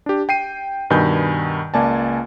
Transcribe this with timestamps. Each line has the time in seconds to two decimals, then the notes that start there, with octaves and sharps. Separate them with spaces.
0.06 D4 G4
0.29 G5 C7 D#7
0.90 G2 B2 D#3 G#5 B5 G6
1.74 C#2 A#3 D5 G#5 A5